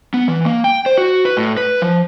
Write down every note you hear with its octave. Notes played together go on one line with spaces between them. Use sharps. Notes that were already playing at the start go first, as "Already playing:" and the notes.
B3
E3
A#3
G5
C5
F#4
B4
A2
B4
F3